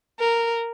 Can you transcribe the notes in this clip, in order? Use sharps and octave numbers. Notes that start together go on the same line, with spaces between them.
A#4